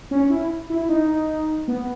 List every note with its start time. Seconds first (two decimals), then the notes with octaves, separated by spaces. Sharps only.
0.11 C#4
0.30 E4
0.70 E4
0.89 D#4
1.68 B3